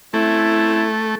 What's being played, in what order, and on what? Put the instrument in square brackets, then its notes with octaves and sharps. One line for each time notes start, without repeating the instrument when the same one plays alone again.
[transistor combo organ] A3 [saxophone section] C4 C#4 E4